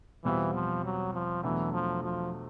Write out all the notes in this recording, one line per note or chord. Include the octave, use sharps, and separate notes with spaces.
E2 B2 E3 G3 C4 F4
F3
F#3
F3
E2 B2 E3 F#3 A3 D4
F3
F3